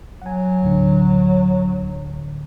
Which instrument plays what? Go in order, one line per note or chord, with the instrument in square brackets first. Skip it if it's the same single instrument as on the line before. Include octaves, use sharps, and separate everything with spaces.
[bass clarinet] F#3 [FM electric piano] F#5 G#5
[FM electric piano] D2 A2 D3